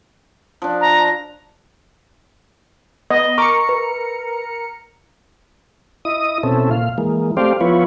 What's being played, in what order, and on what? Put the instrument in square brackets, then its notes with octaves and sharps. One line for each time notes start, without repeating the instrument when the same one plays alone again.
[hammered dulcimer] F3 D4
[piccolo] A#5
[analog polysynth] B3 [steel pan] D#5
[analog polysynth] A#4 A#5 C#7 [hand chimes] C#6 [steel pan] D6
[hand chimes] B4
[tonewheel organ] E4 D#5 D#6
B2 C4 C#4 E4 A4
A#2 F5
E3 G#3 A#3
A3 C4 G4 C5 D5 F5
F3 B3 E4 F4 B4 C#5